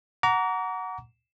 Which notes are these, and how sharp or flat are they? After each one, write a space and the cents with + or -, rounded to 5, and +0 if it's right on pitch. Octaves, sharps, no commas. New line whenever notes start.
F#5 +0 A#5 +0 D6 -45